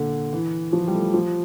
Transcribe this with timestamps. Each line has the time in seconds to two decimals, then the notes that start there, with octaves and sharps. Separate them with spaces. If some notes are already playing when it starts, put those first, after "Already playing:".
Already playing: A#2 D3
0.33 E3
0.73 F3
0.88 G3
0.94 A3
1.14 F3